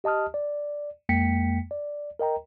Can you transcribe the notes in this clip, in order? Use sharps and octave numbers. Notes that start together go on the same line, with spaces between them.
G4 D#5 A5 D#6 F6
D5
F2 G#3 A#3 G5 B6 C#7
D5
A#4 D#5 G5 A#5